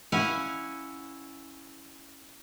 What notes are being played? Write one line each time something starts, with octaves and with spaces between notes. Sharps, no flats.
C#4 E4 F5 F#5 G#5